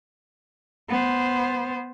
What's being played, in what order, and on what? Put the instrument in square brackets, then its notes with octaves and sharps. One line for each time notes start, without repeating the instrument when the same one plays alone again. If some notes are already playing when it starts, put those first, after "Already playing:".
[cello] B3 C5